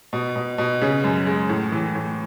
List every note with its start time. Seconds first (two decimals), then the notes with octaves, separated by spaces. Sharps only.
0.13 B2
0.36 B2
0.58 B2
0.81 C#3
1.04 F#2
1.27 G#3
1.49 A2
1.72 E3
1.95 A2